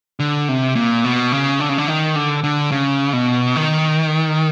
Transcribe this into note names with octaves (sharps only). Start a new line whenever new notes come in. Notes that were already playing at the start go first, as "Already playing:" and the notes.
D3
C3
A#2
B2
C#3
D3
C#3
D3
D#3
D3
D3
C#3
B2
D#3